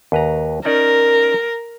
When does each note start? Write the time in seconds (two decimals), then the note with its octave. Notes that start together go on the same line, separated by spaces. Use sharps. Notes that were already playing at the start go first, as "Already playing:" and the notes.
0.12 D#2 B4 A#5
0.65 C#4 D#4 A#4 D5